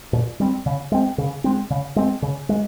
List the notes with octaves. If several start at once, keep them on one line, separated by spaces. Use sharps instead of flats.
A#2
G3 C4
C#3
G#3 C4
C#3
G#3 C4
C#3
G#3 C4
C#3
G#3